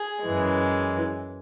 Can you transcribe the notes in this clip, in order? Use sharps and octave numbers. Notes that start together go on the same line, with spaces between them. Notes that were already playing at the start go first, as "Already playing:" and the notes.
Already playing: G#4
F#2 E3 G#3